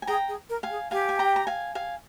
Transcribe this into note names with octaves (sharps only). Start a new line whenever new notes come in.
G#5
G#4 G5 A#5
G#4
A#4
F5 G#5
G#4
G4 F5 G#5
G#5
G5 A#5
A#5
F5 G#5
F5 G#5